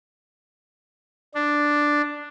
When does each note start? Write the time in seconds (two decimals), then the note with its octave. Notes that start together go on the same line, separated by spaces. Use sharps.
1.35 D4